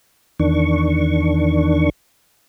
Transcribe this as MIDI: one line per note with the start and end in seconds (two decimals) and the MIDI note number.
0.39 1.90 40
0.39 1.90 51
0.39 1.90 62
0.39 1.90 85